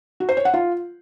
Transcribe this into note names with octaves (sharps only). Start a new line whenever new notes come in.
F#4
C5
C#5
F#5
F4